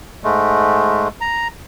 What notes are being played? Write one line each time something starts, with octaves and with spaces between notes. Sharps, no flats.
G#2 G#3 A3
A#5